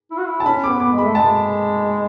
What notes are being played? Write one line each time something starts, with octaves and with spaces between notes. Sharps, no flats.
E4
F#4
E4
A5
C#4 B5
D6
B3
D6
G#3
B5
A3
G#3 A5